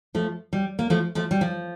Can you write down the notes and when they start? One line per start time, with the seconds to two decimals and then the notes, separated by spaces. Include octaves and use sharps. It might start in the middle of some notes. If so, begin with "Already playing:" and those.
0.15 F3 A3
0.53 G3
0.79 A#3
0.90 F3 A3
1.15 F3 A3
1.31 G3
1.41 F3